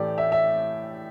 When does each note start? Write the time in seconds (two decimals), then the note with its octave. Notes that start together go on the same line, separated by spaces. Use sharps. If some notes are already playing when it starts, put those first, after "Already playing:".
Already playing: A2 E3 A3 G4 D5
0.18 E5
0.32 E5